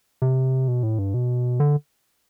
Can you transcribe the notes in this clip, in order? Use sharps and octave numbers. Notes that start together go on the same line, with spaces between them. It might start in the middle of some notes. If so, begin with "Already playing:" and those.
C3
B2
A2
G2
B2
D3